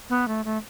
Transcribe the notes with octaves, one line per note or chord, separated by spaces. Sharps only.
B3
A3
A3